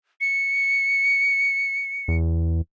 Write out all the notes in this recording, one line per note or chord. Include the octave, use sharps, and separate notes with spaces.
C#7
E2